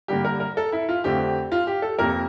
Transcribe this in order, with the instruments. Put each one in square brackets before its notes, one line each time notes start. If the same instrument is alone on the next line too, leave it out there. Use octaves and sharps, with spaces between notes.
[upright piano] G2 D3 G3 A#3 G4
A#4
A#4
A4
E4
F4
F2 D3 A3 C4 G4
F4
G4
A4
F2 C3 F3 A#3 A#4